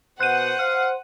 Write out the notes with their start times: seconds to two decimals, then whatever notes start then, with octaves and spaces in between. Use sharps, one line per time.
0.20 B2 C5 F#5 F#6 D#7
0.59 C5 F5